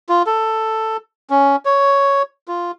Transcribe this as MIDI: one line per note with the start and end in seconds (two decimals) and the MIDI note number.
0.09 0.23 65
0.27 0.97 69
1.30 1.56 61
1.65 2.22 73
2.48 2.71 65